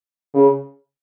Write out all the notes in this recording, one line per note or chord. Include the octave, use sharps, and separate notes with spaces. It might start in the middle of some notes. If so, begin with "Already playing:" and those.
C#3